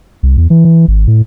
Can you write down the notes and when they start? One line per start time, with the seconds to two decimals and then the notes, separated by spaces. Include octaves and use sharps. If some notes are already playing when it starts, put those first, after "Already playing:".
0.23 C2
0.37 E2
0.50 E3
0.65 E3
0.88 G#1
1.07 A2